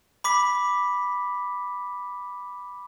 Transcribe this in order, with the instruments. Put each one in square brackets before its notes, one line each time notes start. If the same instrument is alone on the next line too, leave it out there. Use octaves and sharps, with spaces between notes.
[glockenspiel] B5 D6 B6